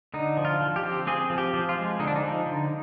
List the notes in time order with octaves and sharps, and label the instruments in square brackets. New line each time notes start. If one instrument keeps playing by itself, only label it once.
[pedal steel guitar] D3 D#4
F3
F4
F3
G4
C4
C4 G#4
F3
G4
F3
F4
G#3
D3 D#4
D4
D#4
F3
D3